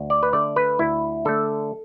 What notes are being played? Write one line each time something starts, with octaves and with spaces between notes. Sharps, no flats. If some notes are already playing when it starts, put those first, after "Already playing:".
Already playing: D2
D5
B4
D3 A3 D5
B4
D2 E4
D3 A3 A4